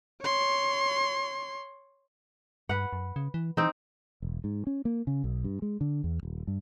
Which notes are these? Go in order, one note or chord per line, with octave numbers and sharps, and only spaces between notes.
C#5 C6
G2 B4 F#5
F#2
C#3
E3
E3 C4 D#4
E1
G#2
C#4
A#3
C#3
B1
G2
G#3
D3
E2
D#1
G2